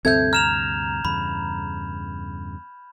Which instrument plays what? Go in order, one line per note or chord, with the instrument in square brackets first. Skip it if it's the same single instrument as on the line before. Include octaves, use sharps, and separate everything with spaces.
[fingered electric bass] D2 G2 C3 [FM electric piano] C4 A4 E5 [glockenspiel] G6 G#6
[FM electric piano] A#5 [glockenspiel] F6 E7 F7
[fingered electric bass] E2 G2 C#3 [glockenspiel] B5